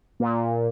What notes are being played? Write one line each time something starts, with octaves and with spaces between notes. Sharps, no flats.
A#2